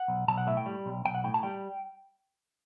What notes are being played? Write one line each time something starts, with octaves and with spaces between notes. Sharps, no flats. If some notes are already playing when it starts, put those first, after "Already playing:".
Already playing: F#5
B1
B1 A5
F#5
A2 E5
G5
G3
B1
B1 G5
F#5
A2 G5
A5
G3 G5